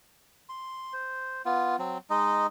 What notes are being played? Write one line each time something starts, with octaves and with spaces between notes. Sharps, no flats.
C6
C5
B3 F4
F#3 C4
G#3 D#4 D#5